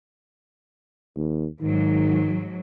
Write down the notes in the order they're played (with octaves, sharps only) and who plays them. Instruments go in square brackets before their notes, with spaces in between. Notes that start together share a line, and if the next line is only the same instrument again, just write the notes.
[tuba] D#2
[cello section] G#2 F#3 [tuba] D#3